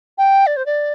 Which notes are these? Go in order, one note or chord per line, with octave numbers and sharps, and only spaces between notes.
G5
D5
C5
D5